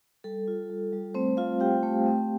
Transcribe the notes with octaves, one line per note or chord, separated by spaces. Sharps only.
G3 A4
F4
G3
G3
A3 C4 C5
A3 F4 F5
F4 G4 G5
A3
C4